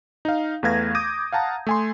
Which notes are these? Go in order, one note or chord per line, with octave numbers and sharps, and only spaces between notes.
D#4 F5
E2 A3 B4 F5 G#6 A#6
D6 D#6 G6 G#6 A#6 D#7
F5 F#5 A5 A#5
A3 G#5 C6